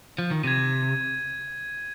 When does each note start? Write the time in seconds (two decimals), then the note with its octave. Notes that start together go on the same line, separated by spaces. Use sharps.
0.18 F3
0.31 D#3
0.44 C3 G#6 D#7